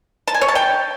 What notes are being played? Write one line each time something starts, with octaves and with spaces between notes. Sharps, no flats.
A5
G#5
C#5
A5
G5